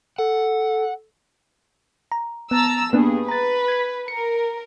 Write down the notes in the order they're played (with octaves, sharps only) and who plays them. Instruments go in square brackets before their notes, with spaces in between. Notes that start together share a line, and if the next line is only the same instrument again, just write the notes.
[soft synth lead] A4 [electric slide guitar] F#5
[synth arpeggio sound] A#5
[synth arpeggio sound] B3 [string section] A5 A#5 E6
[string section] G2 G#4 [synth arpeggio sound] A#3 B3 D4
[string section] B4 [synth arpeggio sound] A#5 A6
[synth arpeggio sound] G#6 B6
[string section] A#4 [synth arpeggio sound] C#7